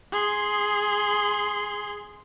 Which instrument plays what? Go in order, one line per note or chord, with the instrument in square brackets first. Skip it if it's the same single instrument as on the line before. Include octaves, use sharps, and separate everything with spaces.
[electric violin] G#4 C6